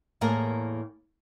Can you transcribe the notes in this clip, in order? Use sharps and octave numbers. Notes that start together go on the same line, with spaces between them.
E2 A2 A#3 G#4 A#4